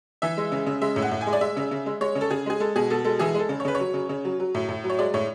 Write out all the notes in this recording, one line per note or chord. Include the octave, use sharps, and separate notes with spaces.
E3 E5
G#3
C#3
C#3
G#3 E5
A2
F#5
A2
G#5
G#3
D5
G#3 E5
C#3
C#3
G#3
G#3 C#5
C#3
A4
C#3 G#4
G#3 G#4
G#3 A4
B2 G#4
B2 A4
G#3 A4
E3 G#4
G#3 A4
C#3
C#5
C#3 B4
C#5
F#3
C#3
C#3
F#3
F#3
A2
A2
F#3
C#5
G#3 D5
A2 C#5